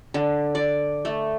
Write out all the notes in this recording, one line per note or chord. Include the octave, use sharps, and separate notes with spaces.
D3
D5
A3